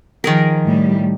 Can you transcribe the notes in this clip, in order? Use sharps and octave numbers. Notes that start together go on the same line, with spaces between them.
D#3 F3 G#4 A#4
A2 G3